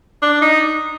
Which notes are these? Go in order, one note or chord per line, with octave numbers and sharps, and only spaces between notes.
D4
D#4